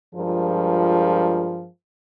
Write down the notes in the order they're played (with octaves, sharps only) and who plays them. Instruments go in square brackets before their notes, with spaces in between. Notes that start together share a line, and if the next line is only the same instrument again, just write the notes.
[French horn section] G2 F3 G#3 F4 G#4 A#4